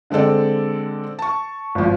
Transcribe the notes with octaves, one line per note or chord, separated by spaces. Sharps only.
D3 G#3 C4 A4 D5
A5 C#6
G#1 F3